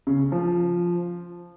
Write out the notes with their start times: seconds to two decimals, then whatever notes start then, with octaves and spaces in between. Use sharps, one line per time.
0.07 C#3
0.32 F3